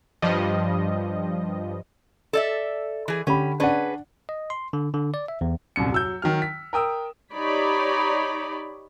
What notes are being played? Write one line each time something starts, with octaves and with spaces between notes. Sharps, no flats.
G2 F3 G3 D#5
A4 D5 E5
E3 G#4
D3 C#4 G4 B5
C#4 D4 G#4 B4 D5 F#5
D#5
C6
D3
D3
D5
E5
E2
D#1 C2 F#2 C#7
F#3 E6 G6
D#3 F#3 F6
B6
A#4 G5 D#6 E6
D#4 G4 C#5 D5 B5